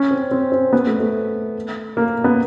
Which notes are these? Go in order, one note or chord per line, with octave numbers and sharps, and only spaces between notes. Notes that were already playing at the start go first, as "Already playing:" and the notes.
Already playing: C#4
C4
C4
C4
B3
A3
A3
A#3
B3